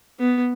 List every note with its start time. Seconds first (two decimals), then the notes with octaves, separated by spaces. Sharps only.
0.19 B3